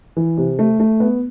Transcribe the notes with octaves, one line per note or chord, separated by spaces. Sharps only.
E3
C3
A3
A3
B3